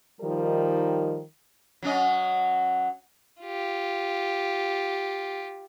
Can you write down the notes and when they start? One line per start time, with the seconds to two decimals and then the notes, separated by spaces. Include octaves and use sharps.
0.21 D#3 F3 G3 D#4 A#4
1.83 F#3 C#4 D#5
3.42 F4 G4